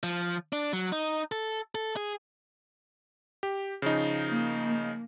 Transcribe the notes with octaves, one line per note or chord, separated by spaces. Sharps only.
F3
D4
F#3
D#4
A4
A4
G#4
G4
C#3 F3 D#4
A#3